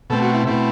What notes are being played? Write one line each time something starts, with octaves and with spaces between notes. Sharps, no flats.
B2 A3 C4 A4
F#4
E4
B2 A3 C4 E4